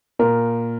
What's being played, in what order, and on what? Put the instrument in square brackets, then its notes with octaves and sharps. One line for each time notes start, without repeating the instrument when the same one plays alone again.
[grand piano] A#2 [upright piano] A#4